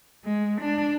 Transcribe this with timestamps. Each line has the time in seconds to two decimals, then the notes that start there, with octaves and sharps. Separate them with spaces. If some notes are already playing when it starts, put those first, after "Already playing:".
0.23 G#3
0.60 D4